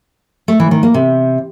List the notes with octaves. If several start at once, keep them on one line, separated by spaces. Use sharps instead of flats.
A3
E3
D#3
A#3
C3